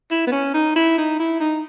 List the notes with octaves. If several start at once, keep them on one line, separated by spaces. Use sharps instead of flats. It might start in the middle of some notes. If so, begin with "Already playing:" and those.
E4
B3
C#4
D#4
E4
D#4
E4
D#4